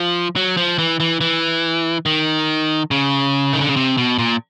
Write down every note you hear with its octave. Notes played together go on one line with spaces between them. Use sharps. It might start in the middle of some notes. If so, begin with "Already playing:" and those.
Already playing: F3
F#3
F3
E3
E3
E3
D#3
C#3
D#3
D3
C#3
C3
B2
A#2